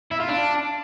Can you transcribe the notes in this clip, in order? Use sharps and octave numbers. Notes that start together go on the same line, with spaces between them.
E4
F4
D4